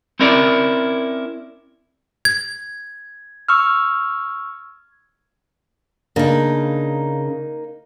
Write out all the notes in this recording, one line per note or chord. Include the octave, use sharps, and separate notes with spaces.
C4 C#4 E4 A#4 D5
G#6
C#6 E6 F6
C#3 A#3 D4 D#4